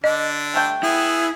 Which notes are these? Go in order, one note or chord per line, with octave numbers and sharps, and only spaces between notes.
D3 D4 D#5
G3 A3 G5
B3 E4 G#4